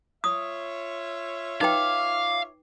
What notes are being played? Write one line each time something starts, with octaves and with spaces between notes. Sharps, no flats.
F4 C#5 E5 D#6
D#4 B4 F5 G5 D6